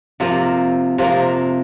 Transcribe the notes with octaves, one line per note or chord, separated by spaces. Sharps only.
C3 F3 A#3
C3 F3 A#3